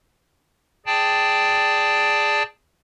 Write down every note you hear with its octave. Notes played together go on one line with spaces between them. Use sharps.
G#4 D5 G5 A5